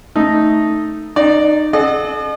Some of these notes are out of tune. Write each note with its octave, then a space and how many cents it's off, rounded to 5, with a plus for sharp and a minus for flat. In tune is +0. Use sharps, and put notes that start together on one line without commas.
A3 +0 D#4 +0
D#4 -20 D5 +0
A4 -45 D#5 -45 F#5 +0